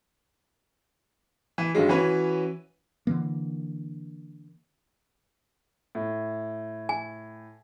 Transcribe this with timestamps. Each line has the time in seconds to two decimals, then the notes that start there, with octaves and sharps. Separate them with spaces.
1.58 E3
1.75 G2 D3 D#3 F#3 G#3
1.89 E3 C#4 F#4 B4 C#5
3.07 D3 E3 A#3
5.95 A2
6.89 G#5